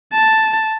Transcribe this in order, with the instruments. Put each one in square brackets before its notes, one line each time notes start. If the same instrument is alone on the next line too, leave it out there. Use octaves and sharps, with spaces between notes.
[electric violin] A5